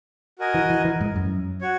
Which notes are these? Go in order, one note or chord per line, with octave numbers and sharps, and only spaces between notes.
F#4 A#4 D#5 G#5
E3
E3
E3
G#2
F#2
F#4 C#5